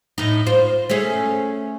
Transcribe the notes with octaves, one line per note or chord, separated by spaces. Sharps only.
A2 D#4
F4 C5
A3 C#4 G#4